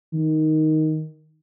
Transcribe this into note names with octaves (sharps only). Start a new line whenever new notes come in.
D#3